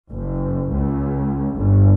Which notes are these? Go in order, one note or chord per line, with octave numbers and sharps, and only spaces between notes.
F#1
C#2
G1